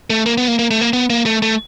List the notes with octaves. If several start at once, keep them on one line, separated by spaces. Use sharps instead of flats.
A3
A#3
B3
A#3
A#3
A3
A#3
B3
A#3
A3
A3